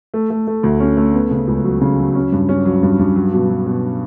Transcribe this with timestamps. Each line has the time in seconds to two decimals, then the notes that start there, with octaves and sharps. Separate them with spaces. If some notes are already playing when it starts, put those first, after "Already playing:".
0.14 A3
0.30 A3
0.47 A3
0.63 D2
0.80 C#4
0.97 A3
1.14 B3
1.31 C#3
1.48 C#2
1.64 F#3
1.81 C#3
1.99 F#3
2.15 C#4
2.32 G2
2.49 C#4
2.65 F#3
2.83 G2
2.99 G2
3.16 F#3
3.33 B2
3.49 F#3
3.67 B2